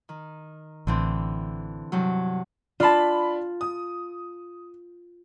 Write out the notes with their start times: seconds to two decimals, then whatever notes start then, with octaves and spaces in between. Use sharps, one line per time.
0.09 D#3
0.87 A1 D3 E3 C4
1.92 G2 C3 F#3
2.80 D4 F4 A5 B5
3.61 D#6